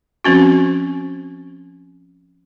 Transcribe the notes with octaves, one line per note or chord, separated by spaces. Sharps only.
F3 C4 C#4 F#4